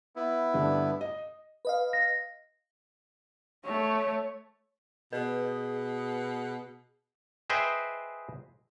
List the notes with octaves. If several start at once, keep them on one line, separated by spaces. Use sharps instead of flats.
B3 E4
G2 D3 D4
D#5
B4 D#5 F5
A#6
A3 C#5
B2 G#4 B4
G#4 B4 C5 D#5 E5 G5